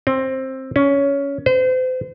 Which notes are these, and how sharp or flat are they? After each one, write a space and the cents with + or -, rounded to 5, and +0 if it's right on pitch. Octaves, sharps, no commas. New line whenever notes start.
C4 +15
C#4 +15
C5 -35